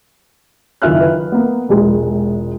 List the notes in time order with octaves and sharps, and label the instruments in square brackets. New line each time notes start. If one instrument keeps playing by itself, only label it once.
[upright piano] F#1 D#3 F4 E5 F6 F#6
B4
A#3 B3
E1 A#1 G#3